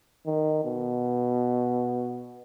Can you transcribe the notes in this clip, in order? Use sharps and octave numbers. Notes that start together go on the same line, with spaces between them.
D#3
B2